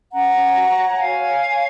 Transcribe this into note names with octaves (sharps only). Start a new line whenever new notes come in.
C#4 F#5 A#5
C#4
F#4
C#5
F#4 F5 G#5
C#5
C#5